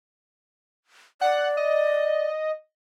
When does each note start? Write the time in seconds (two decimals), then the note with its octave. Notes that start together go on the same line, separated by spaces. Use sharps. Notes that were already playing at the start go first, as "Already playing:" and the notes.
1.21 D5 F#5
1.57 D#5